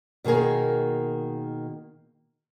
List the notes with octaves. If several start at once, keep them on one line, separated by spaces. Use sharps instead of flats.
B2 D#3 A#3 G#4 A#4